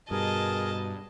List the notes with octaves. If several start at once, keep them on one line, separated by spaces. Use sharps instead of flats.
G2 B2 G#4 A#4 D#5 A5